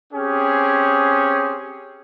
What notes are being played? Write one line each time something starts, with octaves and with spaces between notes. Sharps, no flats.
C4 C#4 G4 G#4